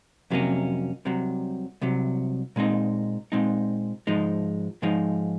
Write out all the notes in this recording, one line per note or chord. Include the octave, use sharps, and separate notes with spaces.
F2 C3 F#3 A#3 C#4
C2 C3 F#3
C2 C3 F#3
A#2 G#3 C4 D#4
A#2 G#3 C4 D#4
G#2 F3 G#3 D#4
G#2 F3 G#3 D#4